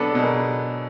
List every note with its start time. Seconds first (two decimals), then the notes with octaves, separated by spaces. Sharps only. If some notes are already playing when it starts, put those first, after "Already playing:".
Already playing: B2 F#3 B3 D4 A4 B4
0.15 B2
0.23 G#4 A#4